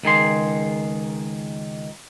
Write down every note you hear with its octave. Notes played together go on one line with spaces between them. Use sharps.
C#2 D#3 G#4 C6